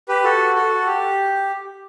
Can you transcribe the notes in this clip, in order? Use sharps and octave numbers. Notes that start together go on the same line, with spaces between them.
G4 B4
F#4 A4
F#4 A4
G4